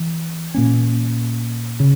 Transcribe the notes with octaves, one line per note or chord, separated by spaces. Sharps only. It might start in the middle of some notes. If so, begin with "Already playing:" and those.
Already playing: E3
A#2 A#3 C#4
C#3